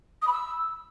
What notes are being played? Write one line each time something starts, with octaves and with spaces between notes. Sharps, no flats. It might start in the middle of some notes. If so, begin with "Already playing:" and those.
D#6
B5
E6